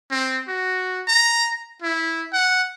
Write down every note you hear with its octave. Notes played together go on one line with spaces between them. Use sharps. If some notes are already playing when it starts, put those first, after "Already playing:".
C4
F#4
A#5
E4
F#5